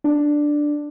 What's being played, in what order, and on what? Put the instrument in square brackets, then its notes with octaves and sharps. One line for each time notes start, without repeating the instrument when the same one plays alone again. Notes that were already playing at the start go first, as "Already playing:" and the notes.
[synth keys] D4